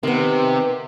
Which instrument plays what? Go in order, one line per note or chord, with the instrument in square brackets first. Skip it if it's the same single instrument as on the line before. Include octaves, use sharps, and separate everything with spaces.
[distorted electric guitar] C3 [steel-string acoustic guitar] D#3 B3